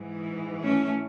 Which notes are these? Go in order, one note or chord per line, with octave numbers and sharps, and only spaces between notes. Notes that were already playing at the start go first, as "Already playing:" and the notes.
Already playing: G#2 E3
A3 C#4